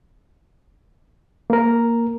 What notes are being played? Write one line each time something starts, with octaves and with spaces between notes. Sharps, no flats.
A#3 A#4